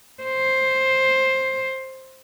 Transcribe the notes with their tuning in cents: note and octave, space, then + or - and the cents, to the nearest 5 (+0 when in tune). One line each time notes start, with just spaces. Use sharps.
C5 +10